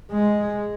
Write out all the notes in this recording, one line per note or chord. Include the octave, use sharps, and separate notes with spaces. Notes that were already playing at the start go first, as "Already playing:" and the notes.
G#3